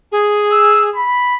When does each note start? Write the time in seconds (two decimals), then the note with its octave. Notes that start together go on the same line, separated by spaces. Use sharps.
0.12 G#4
0.52 E6
0.96 B5